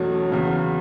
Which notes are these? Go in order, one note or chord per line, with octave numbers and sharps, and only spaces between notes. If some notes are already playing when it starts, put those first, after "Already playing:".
Already playing: E2 B2 F#3 A3 C#4
E2 C#3 F#3